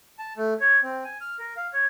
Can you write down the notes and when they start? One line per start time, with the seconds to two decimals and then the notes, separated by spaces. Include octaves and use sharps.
0.19 A5
0.37 A3
0.60 C#5
0.83 C4
1.04 G#5
1.21 F6
1.39 A#4
1.57 F5
1.73 C#5